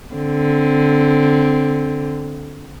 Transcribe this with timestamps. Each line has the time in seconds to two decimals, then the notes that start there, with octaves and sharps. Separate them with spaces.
0.14 D3 C4